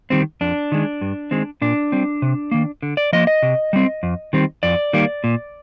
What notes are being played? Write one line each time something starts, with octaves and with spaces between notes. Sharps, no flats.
D#3 G3 C4
F2 D4
D#3 G#3
G2
D#3 G#3 C4
A#2 D4
G3 C4
C3
D#3 A#3
D3
D5
F3 A#3 D#5
D#5
C3
G3 C4
F2
D#3 G3 C4
F2 D5
D#3 G3 A#3
A#2